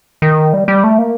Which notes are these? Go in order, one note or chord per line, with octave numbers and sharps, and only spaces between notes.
D#3
G3
G3
A3
A#3